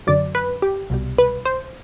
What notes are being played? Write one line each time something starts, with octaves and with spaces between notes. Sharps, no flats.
F#2 D3 F#3 D5
B4
G4
C2 B2 G3
B4
C5